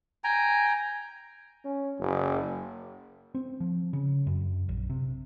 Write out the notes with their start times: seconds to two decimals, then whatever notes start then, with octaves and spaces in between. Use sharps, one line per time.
0.24 G5 G#5 A#5
1.65 C#4
1.99 F#1
3.35 C4
3.60 F3
3.93 C#3
4.27 F#2
4.69 A#1
4.90 C3